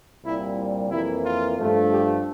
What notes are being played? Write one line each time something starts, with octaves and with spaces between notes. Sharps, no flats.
C2 A#2 G3 E4
F2 E3 A#3 E4
F4
G2 F3 A3
G4